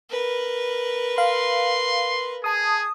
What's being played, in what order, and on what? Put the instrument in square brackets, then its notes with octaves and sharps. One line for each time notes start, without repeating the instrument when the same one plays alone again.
[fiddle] A#4 B4
[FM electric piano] F5 [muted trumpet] C6
[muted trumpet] G#4 [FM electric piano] A5 D#6